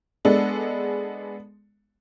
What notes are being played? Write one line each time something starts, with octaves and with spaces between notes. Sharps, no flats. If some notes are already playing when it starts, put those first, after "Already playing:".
G#3 B3 D4 A4